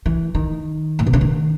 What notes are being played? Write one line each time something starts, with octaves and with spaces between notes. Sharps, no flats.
E3
D#3
A2
B2
C#3
D#3